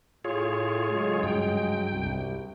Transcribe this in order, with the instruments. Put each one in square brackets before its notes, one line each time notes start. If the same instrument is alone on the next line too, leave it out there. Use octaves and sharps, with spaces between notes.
[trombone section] A2 [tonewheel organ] F4 G#4 C#5
[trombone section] C#3 F#3 G#3
[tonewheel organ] G2 G5
[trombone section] C2